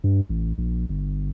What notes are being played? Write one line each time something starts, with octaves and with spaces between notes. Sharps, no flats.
G2
A1
A#1
G1